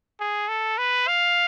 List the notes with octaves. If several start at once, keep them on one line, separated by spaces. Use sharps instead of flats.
G#4
A4
B4
F5